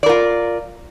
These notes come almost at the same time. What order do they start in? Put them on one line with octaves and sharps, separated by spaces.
D5 A#4 F4